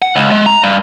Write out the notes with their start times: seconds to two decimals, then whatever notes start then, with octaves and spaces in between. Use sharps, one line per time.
0.02 F#5
0.16 C#2
0.31 G#3
0.46 A#5
0.63 G2